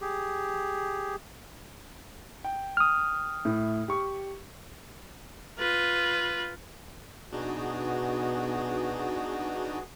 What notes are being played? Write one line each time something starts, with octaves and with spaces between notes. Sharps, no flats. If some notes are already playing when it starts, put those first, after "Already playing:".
G4 G#4
G5
D#6 F6
A2 E4
G4 C#6
F4 B4
B2 B3 D4 D#4 F#4 G#4